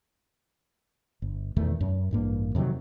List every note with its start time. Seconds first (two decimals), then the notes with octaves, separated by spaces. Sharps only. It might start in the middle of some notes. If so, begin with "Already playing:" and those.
1.22 G1
1.56 E2 B2 D#3 A3
1.81 F#2
2.11 A1 G2 A#3
2.55 F2 C3 D#3 F#3